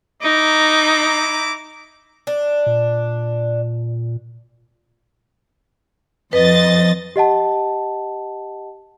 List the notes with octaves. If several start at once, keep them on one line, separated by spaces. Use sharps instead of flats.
D#4 E4 A#5 D6
D4
A#2
F2 B4 D#5 A6
G4 D#5 F#5 A5